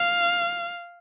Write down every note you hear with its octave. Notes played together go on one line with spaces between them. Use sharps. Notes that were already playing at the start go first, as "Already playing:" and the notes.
Already playing: F5